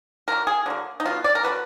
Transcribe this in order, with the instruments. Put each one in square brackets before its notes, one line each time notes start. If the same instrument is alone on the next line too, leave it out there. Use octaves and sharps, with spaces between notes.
[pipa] D3 F#3 A#3 A#4
G#4
D3 F#3 A#3
D#4
D3 F#3 B3 F4
D5
A#4
D3 F#3 B3 B4